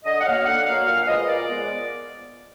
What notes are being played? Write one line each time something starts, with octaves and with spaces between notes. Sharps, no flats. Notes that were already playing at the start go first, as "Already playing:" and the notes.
D3 D#5
F#5
F#3 A#3 F5
D3 F#5
F#3 A#3 F5
A#2 F5
F5
F3 G#3 B3 D#5
A#2 D5
F3 G#3 B3